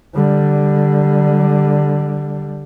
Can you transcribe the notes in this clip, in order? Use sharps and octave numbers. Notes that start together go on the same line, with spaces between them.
D3 G3